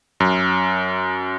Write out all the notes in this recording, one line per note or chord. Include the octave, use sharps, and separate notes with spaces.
F#2